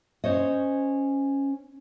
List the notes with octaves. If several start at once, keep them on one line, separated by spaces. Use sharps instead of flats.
C#4 C5 C#5 D#5